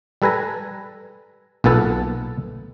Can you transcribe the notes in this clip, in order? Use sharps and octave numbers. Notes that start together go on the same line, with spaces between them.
G3 A4 B4 G#5 A#5
B1 A#2 B3 A4 F#5